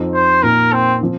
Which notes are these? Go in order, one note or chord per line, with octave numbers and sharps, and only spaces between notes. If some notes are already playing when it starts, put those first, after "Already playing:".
Already playing: F2 F3 C4 D#4
C5
A#2 A#3 D#4 A#4
C4
F3 C4